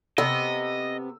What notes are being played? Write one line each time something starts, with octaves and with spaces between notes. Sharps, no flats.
C3 B3 D#5 E6